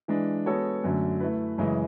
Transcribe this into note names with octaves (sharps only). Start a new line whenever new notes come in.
E3 G#3 D4
G#3 B3 F#4 A4 C#5
F#2 D3 F#3 A3
A3 E4 B4
F#2 C#3 E3 G#3